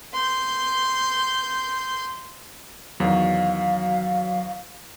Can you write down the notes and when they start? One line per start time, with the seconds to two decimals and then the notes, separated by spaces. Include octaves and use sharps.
0.14 C6 G6
3.00 E2 D#3 F#3 F5